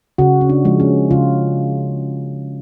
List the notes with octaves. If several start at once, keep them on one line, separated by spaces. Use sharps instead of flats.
C#3 F#4
C#4
D4
F3 G#3
C#4
C#3 F4